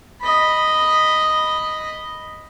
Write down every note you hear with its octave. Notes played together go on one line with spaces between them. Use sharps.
D#5 B5